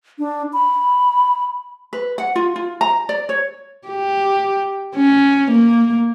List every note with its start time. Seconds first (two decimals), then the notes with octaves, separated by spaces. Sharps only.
0.19 D4
0.53 B5
1.93 B4
2.18 F#5
2.36 F4
2.56 F4
2.81 A#5
3.09 D5
3.29 C#5
3.88 G4
4.95 C#4
5.51 A#3